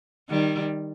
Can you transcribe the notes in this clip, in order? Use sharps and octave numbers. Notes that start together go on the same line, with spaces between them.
D#3 G3